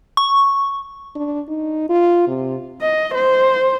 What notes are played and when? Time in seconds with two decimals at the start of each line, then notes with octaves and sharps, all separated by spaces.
0.17 C#6
1.15 D4
1.48 D#4
1.89 F4
2.28 C3
2.81 D#5
3.15 C5